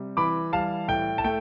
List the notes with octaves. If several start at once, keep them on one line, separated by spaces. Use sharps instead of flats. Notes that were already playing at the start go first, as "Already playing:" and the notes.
Already playing: C3 G3
E3 B5 D6
G3 F5 A5
A2 G5
A5
A3 G5